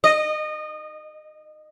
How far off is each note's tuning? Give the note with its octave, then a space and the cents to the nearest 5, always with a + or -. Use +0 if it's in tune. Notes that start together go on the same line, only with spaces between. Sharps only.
D#5 -25